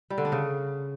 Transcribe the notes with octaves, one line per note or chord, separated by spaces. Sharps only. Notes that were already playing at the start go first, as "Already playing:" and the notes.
G3
D3
D4
C#3